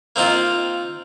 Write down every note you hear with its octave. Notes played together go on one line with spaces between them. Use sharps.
A#3 C4 D#4 F4